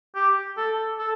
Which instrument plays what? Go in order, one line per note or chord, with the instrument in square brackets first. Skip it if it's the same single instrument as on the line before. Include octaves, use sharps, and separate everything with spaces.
[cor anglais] G4
A4
A4